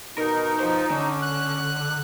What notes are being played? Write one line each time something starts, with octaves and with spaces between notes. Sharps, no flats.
B2 D#4 A#4
F4 C5
D3 C#4
F#6